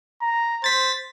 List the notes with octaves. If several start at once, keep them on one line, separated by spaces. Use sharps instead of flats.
A#5
C5 A6 B6